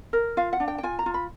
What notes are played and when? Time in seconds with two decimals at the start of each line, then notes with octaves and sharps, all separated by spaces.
0.13 A#4
0.37 F4 F5
0.53 F#5
0.60 D4
0.68 G5
0.78 G5
0.83 F4 G#5
0.99 A#5
1.06 F4
1.14 B5